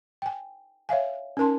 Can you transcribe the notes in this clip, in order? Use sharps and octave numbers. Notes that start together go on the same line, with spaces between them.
G5 G#5
C#5 E5 F5 G#5
C#4 D#4 A#4 A5 C6